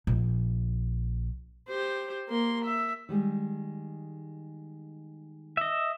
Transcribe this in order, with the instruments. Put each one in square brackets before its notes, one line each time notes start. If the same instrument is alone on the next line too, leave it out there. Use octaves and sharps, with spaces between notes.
[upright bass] A#1
[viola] G4 C5
A#3 C6
E5
[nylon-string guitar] D#3 G3 G#3
[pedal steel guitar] D#5 E5